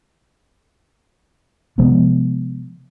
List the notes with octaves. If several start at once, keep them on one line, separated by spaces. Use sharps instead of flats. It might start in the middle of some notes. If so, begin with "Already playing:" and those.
C3 F3 G#3 B3